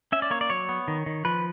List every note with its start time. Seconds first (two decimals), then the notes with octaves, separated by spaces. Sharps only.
0.12 C#4 E5
0.22 D5
0.31 A#3 C#5
0.41 D5
0.50 F#3 C#5
0.69 B3
0.88 D#3
1.06 D#3
1.25 F3 B4